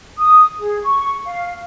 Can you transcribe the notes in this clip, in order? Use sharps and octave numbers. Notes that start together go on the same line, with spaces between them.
D#6
G#4
C#6
F5